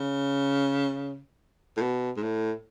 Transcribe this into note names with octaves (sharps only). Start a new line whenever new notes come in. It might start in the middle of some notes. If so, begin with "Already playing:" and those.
Already playing: C#3
A2
B2
G#2
A2